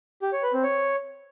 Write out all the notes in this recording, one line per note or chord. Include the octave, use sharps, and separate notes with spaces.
G4
C#5
B4
C4
C#5